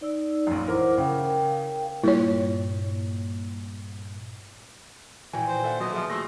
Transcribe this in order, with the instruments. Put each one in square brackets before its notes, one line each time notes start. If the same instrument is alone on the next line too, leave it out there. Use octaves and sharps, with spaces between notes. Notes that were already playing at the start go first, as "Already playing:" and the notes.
[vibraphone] D#4 D5 E6
[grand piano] A#1 F#2
[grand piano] E3 A#4 [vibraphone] C5 F#5 D6
[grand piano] C#3 [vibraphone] A#4 F5 G5
[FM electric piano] G2 A#2 [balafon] E4 C#5
[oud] A#2 D#3 F#4 [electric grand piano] E3 G5 [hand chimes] G#5
[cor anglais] C5
[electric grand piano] A4 E5 F#5
[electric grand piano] B2 F#3 B3 [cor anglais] D#5
[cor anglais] F3 [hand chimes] G#4 E5
[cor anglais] A3 [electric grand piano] C6 A#6